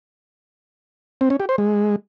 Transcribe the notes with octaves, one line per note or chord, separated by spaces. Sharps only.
C4
C#4
G4
C5
G#3